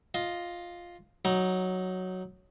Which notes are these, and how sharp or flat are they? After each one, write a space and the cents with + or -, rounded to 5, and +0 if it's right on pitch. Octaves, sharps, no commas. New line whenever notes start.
F4 +5 D#5 +0
F#3 +0 D#4 +0